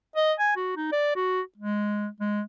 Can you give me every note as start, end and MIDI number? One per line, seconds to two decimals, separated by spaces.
0.16 0.33 75
0.39 0.56 80
0.56 0.73 66
0.76 0.91 63
0.92 1.15 74
1.15 1.41 66
1.58 2.08 56
2.20 2.42 56